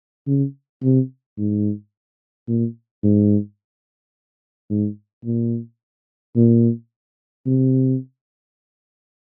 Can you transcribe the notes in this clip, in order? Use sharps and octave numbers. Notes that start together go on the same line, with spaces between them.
C#3
C3
G#2
A#2
G#2
G#2
A#2
A#2
C3